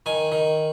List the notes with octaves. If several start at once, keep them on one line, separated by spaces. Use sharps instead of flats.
D#3 G#5
D#3